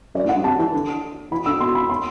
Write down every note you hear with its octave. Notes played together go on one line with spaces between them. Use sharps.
F#2 D5
A2
F#5
G2
C3 A5
E3
D3
E3 B5
D3 E6
B2 C6
B5
C6